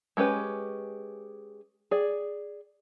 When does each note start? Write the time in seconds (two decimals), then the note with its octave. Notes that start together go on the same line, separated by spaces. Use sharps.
0.17 G#3 C#4 G4 B4
1.91 G#4 D5